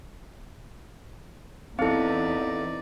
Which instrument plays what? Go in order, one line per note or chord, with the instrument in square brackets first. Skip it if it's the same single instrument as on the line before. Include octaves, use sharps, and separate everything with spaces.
[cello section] E2 [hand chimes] C4 E4 [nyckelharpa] D#4 D5 [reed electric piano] A4 F5